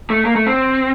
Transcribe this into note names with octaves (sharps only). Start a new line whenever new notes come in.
A3
A#3
A3
C4